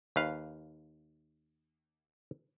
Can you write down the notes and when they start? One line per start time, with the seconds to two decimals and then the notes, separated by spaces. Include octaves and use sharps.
0.16 D#2 B4 F5